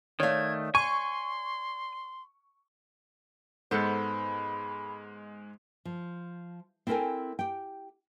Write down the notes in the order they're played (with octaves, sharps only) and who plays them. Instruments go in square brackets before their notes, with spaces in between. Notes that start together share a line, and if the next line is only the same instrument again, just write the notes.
[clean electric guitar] D#3 A3 [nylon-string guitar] C#5 D5 F5 [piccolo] G#6
[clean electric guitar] G#5 [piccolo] C6 [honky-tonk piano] C#6
[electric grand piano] G#2 G#3 [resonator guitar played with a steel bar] B3 A4 C5 [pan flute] B5
[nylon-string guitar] F3
C4 E4 A4 A#4 G5 G#5
G4 G5